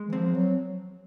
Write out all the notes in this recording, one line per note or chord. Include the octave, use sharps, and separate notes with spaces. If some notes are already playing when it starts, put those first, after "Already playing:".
Already playing: G#3
E3
F3 C4
F#3